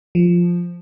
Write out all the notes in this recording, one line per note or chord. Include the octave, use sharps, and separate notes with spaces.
F3